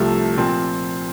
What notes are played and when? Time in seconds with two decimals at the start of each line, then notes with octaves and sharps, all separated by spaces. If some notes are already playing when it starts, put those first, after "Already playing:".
Already playing: C2 C3 F3 A3
0.37 A#2 F3 C4